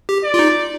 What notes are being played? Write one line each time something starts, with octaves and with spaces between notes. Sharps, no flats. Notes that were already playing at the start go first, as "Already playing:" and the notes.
G4
D5
F4
D#4